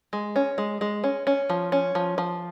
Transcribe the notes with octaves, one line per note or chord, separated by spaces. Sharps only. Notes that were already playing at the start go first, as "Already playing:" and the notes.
G#3
C#4
G#3
G#3
C#4
C#4
F3
C#4
F3
F3